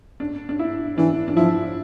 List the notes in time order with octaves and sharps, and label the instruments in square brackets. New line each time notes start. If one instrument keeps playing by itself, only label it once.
[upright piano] D4
D4
E4
[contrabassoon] E3 [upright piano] D4
[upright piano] D4
[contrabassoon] F3 [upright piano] E4